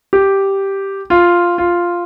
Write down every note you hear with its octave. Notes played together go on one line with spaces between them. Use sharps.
G4
F4
F4